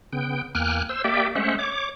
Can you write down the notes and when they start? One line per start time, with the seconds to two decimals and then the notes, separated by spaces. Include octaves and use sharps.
0.13 C#3 B3 G5
0.55 E2 A#3 G5 G#5 F6 F#6
0.89 C5 E6
1.04 A#3 G4 D5 E5 G5
1.35 G#3 A3 C#4 C5 E5 F#5
1.59 C#5 D6